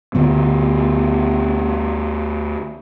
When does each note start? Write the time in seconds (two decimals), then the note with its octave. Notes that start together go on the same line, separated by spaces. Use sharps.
0.15 D2 D3 B3